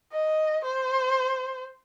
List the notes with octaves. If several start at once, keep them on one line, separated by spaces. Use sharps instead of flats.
D#5
C5